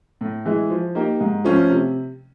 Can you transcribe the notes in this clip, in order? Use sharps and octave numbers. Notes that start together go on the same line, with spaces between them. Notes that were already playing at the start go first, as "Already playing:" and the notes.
A2
E3 G#3
F3
A#3 D#4 G4
G#2
F3 A3 C#4 F4
C3